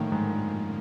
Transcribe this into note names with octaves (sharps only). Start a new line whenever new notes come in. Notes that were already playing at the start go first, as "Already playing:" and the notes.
Already playing: F#2 A2 D3 D#3 F3 A#3
G#2